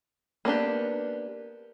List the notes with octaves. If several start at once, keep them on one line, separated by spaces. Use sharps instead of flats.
A#3 B3 D4 G4